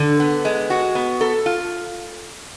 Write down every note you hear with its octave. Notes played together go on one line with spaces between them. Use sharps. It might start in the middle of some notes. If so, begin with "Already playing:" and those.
Already playing: D3
B3
G#3
F#4
B3
A4
F4